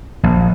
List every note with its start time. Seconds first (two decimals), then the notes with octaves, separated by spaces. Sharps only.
0.23 A#1